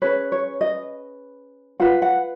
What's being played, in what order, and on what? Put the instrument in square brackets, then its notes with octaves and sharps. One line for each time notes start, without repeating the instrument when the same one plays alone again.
[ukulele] C#4 G#4 B4 C#5
C#5
D#5
F4 B4 F#5
F#5